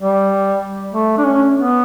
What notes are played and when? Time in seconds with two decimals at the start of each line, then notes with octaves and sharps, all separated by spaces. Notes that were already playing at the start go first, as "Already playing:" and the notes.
0.01 G3
0.94 A3
1.18 D4
1.24 C#4
1.55 B3